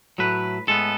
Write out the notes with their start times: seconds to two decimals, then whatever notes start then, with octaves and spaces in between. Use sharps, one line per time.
0.18 A2 F#3 A3 B4
0.67 A2 G#3 B3 A4